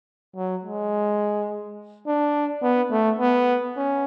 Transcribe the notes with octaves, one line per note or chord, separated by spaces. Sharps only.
F#3
G#3
D4
B3
A3
B3
C#4